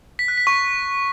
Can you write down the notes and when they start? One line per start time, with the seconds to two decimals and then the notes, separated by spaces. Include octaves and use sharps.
0.19 B6
0.28 F#6
0.38 B6
0.47 C#6